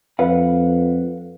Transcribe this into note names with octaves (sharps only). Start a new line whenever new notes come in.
F2 B4 F5 F#5